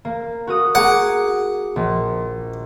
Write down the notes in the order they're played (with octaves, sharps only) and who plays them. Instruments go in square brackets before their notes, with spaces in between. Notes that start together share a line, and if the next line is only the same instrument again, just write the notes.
[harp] A#3
F#4 A#4 D#6
[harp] G#4 A#5 D6 [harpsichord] F#5
[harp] A#1